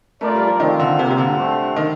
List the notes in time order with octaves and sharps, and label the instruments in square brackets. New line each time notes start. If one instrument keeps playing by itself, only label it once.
[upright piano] A3 [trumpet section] F4 A#4 D5
[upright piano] G3
F3
[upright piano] D#3 [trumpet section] A3 C4 F4
[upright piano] D3
[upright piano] C3 [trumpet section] G3 A#3 F4
[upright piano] C3
D3
[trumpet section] A3 D4 G4 C5
[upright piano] D#3